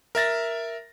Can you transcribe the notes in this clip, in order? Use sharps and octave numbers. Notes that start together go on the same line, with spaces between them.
A#4 E5 A6 A#6